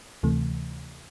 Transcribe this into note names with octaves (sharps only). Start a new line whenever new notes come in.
D2 C3 E3 A3